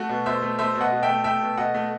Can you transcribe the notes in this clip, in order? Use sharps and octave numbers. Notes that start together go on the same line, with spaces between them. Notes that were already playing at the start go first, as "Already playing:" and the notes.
Already playing: A3 F#4
B2
B2 C5 E5
A3
A3 C5 E5
B2
D#5 F#5
B2
E5 G5
A3
A3 E5 G5
B2
B2 D#5 F#5
A3